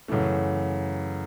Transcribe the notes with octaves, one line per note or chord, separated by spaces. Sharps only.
F#2 C#3 E3 A3